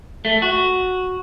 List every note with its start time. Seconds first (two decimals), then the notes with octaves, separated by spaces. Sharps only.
0.25 A3
0.42 F#4